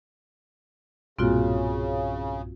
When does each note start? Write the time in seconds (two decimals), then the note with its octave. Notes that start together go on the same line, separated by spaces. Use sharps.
1.19 B1 G2 A#2 C#3 C4 F4 F#4